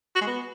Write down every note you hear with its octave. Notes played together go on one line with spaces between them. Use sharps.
F#4
G#3
B3